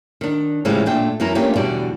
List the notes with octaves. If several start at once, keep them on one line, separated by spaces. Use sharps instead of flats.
D#3 D4
A2 C#3 E3 F3 G3 G#3
A#2 A3 D4 G5
F#2 E3 C#4 E4 A#4
A3 A#3 C#4 D4 F4 G4
E2 B2 D3 G3 D5